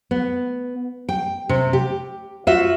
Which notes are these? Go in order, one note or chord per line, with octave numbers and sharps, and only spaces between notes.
B3
G5
C3
G4
F4 F#4 E5